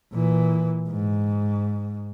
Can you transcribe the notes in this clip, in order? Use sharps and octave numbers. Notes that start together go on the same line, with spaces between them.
A#2 E3
G#2